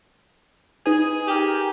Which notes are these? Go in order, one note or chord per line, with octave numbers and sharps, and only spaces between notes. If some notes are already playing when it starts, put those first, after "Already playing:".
D#4 G#4 B4 D#6
G4 A#4